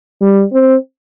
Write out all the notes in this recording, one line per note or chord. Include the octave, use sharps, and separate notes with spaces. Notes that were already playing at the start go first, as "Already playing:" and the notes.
G3
C4